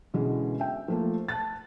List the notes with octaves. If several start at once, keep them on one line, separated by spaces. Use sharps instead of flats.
B2 D3 E3 G#3 B3 C#4
E5 G5
F3 A3 A#3
A5 F#6 A6